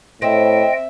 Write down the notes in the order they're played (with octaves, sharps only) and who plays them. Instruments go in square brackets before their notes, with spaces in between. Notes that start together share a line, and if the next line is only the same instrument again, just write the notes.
[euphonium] A2 [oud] C4 [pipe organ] D#5 G5 [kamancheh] E5